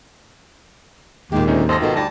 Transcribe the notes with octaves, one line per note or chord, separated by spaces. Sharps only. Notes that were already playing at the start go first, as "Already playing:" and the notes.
D#2 A#2 G#3 G4
D2 C4 C#4 D#4
G#1 A4 C5 D#5 A#6
B2 D#3 D#4 F4 A4
D2 G3 A5 A#6